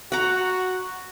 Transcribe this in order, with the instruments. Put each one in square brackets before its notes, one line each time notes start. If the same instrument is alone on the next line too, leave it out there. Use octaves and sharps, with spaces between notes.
[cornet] F#4 [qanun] F#5 A#5